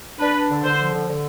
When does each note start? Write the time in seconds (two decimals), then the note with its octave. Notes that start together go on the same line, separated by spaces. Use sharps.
0.19 D4 B4
0.35 D4
0.49 D3
0.63 D3 C5
0.78 F3
0.93 D3
1.08 D3